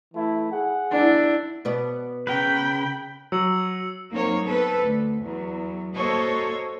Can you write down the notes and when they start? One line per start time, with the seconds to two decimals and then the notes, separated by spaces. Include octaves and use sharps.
0.14 E3 A3 E4
0.52 G#4 F#5
0.91 D4 E4
1.65 B2 B3 D5
2.27 C#3 A#4 B4 G5 B5
3.32 F#3 E6 C#7 F#7
4.11 F#3 A#3 C4 D#4 A#4 C#5
4.44 B3 C4 A4 B4
4.82 D2
5.23 E2 F#3
5.95 A#3 F#4 A4 C5 C#5 D#5